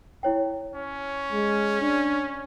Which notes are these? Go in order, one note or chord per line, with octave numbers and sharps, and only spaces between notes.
E4 C#5 G5
C#4
G#3
D4